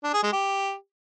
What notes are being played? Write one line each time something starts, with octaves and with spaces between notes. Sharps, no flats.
D4
G#4
G#3
G4